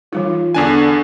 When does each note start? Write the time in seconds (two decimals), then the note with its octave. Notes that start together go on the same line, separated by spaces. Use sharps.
0.13 E3 G3 D#4 F4
0.55 E2 D3 D4 G#5